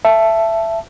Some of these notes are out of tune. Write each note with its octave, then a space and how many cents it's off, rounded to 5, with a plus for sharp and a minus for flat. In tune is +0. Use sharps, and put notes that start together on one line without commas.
E5 +15 A5 -5